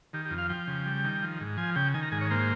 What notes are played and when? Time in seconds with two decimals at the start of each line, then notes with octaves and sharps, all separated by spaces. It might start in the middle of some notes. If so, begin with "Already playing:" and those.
0.13 D#3 G4
0.25 G4
0.31 F2
0.38 F5
0.49 F3 G5
0.67 C#3
0.86 G3
1.04 D#3
1.22 F3
1.41 G#2
1.57 F3 G#5
1.76 C#3 G5
1.94 D#3 G#5
2.03 A#5
2.12 G#2 G#5
2.21 C#5
2.30 A#3 C5